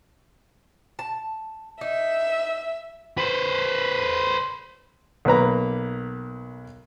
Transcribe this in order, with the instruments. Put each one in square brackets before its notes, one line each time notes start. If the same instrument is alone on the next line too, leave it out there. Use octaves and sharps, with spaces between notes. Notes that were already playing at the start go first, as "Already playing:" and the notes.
[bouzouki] A5
[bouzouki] D#4 [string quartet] E5
[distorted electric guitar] B4 C5
[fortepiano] B1 A#3 B4 A#5